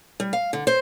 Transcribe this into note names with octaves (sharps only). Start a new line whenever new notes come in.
G3
F5
D3
C5